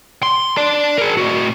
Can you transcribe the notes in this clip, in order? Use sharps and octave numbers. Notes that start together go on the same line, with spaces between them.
C6
D5 A5
G#4 A#4
A2 F#4